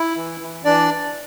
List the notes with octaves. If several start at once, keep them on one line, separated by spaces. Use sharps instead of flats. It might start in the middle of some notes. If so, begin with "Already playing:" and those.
Already playing: E4
E3
E3
E3 D4 D5